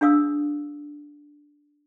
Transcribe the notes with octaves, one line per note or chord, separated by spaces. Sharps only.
D4 G#4 F5 D#6 E6